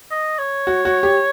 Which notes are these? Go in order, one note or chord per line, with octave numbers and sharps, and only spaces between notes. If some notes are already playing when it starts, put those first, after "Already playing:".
D#5
C#5
F#4
F#4
G4